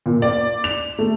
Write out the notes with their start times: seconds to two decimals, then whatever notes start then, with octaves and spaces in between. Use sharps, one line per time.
0.06 A#2
0.22 D5
0.64 F7
0.99 A3